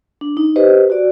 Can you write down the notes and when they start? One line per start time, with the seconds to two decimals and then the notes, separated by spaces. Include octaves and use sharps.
0.21 D4
0.37 D#4
0.56 G4 B4 C5 D#5
0.90 F#4 D5